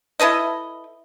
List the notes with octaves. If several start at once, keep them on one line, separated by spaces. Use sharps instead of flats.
E4 A4 B4 D#5